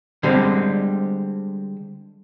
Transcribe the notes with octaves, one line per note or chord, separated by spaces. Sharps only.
D3 G3 G#3 C4